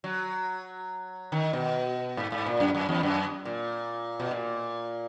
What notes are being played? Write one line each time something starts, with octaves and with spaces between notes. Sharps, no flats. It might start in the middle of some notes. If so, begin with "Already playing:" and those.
F#3
D#3
B2
G#2
G#2
A#2
F#2
F#2
E2
F#2
A#2
B2
A#2